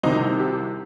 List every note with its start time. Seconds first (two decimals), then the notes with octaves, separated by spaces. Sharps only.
0.03 C2 C3 D#3 D#4
0.40 G4